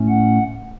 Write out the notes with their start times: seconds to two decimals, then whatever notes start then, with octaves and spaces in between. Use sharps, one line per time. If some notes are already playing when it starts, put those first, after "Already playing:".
Already playing: A2 A3 C#4
0.09 F#5